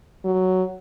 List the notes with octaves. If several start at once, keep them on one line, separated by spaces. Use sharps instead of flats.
F#3